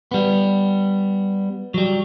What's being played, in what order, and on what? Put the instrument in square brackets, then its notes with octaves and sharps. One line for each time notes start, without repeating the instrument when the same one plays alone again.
[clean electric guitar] G3 B3
F#3 G3